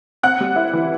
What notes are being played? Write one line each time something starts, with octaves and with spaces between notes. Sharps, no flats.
C4 F#5 F#6
G3
E4
E3